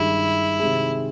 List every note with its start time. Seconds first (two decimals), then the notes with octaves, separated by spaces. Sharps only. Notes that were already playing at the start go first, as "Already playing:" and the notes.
Already playing: G2 D#3 G#3 E4
0.60 C3 D#3 G#3